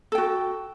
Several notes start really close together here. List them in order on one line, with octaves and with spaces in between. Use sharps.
A4 G5 F#4